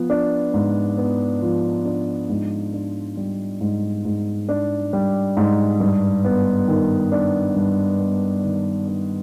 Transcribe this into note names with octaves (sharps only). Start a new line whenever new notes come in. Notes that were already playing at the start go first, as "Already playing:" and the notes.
Already playing: F3 B3
D4
G#2
B3
F3
D4
G#2
D4
G3
G#2
G#2
D4
G3
G#2
G2
B3
D#3
D4
G2
B3
D#3
D4